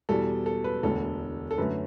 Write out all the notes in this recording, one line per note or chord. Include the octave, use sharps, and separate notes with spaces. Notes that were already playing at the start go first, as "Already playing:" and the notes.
E2 B2 G3 A4
A4
B4
E1 D2 D3 A4
A4
F#2 D3 A3 C#4 B4